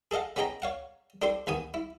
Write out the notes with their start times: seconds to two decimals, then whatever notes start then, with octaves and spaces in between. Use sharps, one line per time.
0.11 G#4 A4 D#5 F5 F#5
0.36 B3 C#4 G#4 D#5 G5 A#5
0.62 C#5 F5 F#5
1.22 D4 G4 A4 C5 C6
1.47 D#2 B3 G#5 D#6
1.74 E4